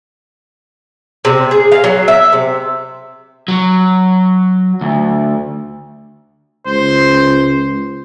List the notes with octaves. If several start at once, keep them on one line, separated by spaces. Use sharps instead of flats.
C3
G#4
F5
F#3
E5
C3
F#3
D2
C#2 C5